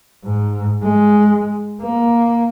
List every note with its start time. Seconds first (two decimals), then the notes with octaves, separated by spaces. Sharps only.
0.25 G#2
0.84 G#3
1.82 A#3